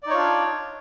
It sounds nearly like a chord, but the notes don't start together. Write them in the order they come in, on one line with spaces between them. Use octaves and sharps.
D5 D#4 C#5 F4 D4